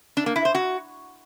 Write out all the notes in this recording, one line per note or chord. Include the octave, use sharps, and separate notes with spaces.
D4
A#3
E4
C5
F#4